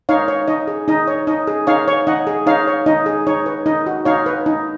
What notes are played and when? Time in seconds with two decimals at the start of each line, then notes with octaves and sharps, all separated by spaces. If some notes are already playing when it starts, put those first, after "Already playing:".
0.09 D#4 C#5 F5
0.28 C#5
0.48 D#4 D#5
0.67 G#4
0.88 D#4 D#5
1.08 C#5
1.27 D#4 D#5
1.47 G#4
1.67 D#4 C#5 F5
1.88 C#5
2.07 D#4 D#5 F#5
2.27 G#4
2.47 D#4 C#5 F5
2.67 C#5
2.86 D#4 D#5
3.06 G#4
3.27 D#4 C#5
3.46 B4
3.66 D#4 D#5
3.86 F#4
4.05 D#4 C#5 F5
4.26 B4
4.46 D#4